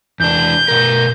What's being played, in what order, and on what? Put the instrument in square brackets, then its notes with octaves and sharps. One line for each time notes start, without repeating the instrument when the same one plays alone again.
[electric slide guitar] E2 D4 [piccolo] G6
[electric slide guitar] B2 A#4